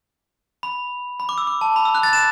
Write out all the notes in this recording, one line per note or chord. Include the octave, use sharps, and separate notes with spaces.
B5
B5
D6
E6
D6
A5
B5
E6
F#6
A6
E7